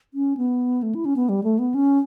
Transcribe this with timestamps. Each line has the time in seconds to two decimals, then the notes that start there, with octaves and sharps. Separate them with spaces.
0.14 C#4
0.37 B3
0.83 A3
0.95 E4
1.05 C#4
1.16 B3
1.29 G3
1.43 A3
1.59 B3
1.74 C#4